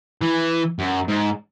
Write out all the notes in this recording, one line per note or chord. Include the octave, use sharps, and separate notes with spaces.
E3
F#2
G#2